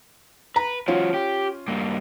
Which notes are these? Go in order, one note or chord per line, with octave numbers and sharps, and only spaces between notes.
B4 A#5
F3 C#4 F4 F#4
G4
G2 A#3